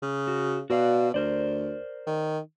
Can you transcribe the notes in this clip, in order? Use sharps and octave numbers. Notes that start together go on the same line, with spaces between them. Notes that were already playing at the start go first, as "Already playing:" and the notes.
C#3
F#4
B2 F#4 D5 F5
D2 A#4 C5 D5
D#3